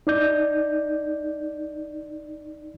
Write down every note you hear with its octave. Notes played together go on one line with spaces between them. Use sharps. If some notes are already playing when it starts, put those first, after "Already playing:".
D#4 D5 G6